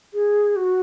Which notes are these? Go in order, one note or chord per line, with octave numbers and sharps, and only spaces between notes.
G#4
F#4